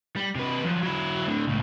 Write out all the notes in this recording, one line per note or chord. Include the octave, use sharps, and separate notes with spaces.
G3
C3 B4
F3 F#3
F#3 E4
A2 D3
C#2 A2